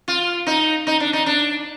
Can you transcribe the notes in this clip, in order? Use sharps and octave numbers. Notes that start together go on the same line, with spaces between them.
F4
D#4
D#4
D4
D#4
D4